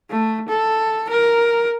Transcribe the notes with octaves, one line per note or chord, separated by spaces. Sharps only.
A3
A4
A#4